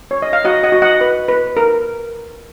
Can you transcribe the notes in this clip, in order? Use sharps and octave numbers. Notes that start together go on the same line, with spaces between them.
C#5
D#5
F5
F#4 D#5 F#5
D#5 F#5
F#4
D#5 F#5
B4
B4
A#4